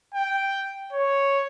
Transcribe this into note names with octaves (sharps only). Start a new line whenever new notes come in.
G5
C#5